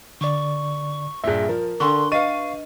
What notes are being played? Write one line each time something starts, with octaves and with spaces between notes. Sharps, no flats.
D3 D5 C#6
G2 A#2 G#4 E5
F3 A#4
D3 D4 C6 C#6
B4 D#5 F5 C#6 D#7